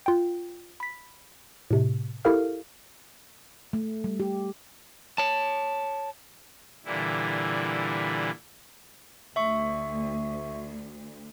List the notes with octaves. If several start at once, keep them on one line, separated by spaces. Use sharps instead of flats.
F4 G5
B5 B6
A2 C3
E4 G4 A4 A#4 F5 F6
A3
G3
G4
C#5 A5
A#2 D3 E3 G3 E4
D2 E5 C#6